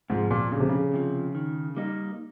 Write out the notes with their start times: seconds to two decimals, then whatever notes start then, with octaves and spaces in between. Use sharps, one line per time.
0.10 G#2 C3 F3
0.31 A#2
0.51 F2 C#3
0.60 C3
0.69 C#3
0.93 C3 F3
1.35 D#3
1.77 G3 A#3 D#4